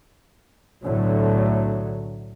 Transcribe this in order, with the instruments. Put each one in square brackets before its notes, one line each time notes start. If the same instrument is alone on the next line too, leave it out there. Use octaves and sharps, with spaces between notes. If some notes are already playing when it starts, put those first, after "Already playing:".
[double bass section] B1 A2 D3 F#3 A3